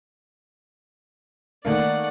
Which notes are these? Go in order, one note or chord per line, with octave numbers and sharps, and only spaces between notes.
D#3 A3 A#3 D5 F#5